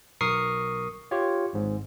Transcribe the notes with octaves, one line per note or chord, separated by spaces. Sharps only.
B1 A#4 C#6 D#6 C7
F4 G4 C#5
G#1 G#2